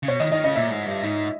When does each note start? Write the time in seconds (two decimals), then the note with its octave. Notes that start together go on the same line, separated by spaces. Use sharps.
0.03 C#3
0.08 B2 C#5
0.20 D#3 D#5
0.31 D#3 D#5
0.44 C#3 D#5
0.55 A#2 E5
0.71 G#2
0.86 G2
1.03 G#2